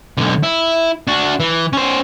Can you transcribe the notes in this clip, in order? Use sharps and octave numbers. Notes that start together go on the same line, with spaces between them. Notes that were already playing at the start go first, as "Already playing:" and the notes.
B1 D3
E4
D4 F#4
E3
C#4 C5